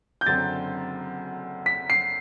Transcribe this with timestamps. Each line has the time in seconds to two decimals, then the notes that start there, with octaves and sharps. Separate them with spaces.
0.21 G6
0.26 F#1 F#2 D3 F#3 C4 A6
1.66 B6
1.90 C7